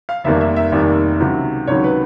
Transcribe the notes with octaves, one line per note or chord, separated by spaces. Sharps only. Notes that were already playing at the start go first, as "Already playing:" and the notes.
F5
F1 D#2 D#3 G3 A#3 E5
E5
E5
F1 D#2 D#3 G3 A#3
C#2 C3 D#3 F#3
C#2 C3 D#3 F#3 C#5
B4